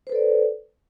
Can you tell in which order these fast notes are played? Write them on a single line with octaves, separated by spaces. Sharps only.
C5 B4 A4 D5